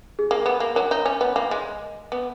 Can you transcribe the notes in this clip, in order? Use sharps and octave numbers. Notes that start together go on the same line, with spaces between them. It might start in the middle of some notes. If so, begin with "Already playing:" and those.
G#4
A#3 A#4
B3
A#3
F#3 A#4
D#4
C#4
B3
A#3
G#3
B3